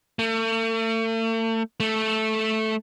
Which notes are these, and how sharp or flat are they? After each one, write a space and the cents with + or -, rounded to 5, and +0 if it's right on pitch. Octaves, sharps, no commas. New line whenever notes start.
A3 +40
A3 -5